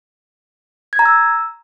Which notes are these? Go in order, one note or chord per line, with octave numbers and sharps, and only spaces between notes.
G#6
A#5
E6